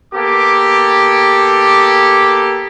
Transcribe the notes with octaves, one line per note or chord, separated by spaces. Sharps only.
A#3 B3 G4 A4 D6